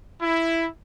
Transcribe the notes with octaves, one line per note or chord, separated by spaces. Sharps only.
E4